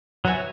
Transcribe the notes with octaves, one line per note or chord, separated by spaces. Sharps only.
F#3 B3 F#4 E5 G#5